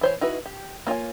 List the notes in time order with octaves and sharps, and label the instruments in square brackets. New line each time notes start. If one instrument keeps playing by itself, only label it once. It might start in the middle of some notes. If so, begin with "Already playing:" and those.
[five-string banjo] E3 C5 C#5
D#4 E4 F#4 B4
G4
A#3 F4 C#5 G#5